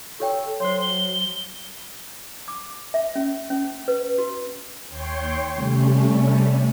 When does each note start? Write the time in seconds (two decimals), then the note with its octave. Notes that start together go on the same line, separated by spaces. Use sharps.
0.20 G4 A4 C#5 G5
0.60 F#3 C5 C#5 C6
0.81 G7
2.48 D6
2.94 E5
3.16 C#4
3.50 C#4
3.88 B4
4.18 F#4
4.89 D#2 C#5 G5 C6
5.54 C3 G3 A3 C#4